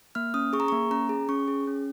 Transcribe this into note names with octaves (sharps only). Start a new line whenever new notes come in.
A#3 F6
C#4 D#6
G#4 C#6
A#5
C#6
A#3
C#4 A#5
G#4
C#4 C#6
G#4
C#4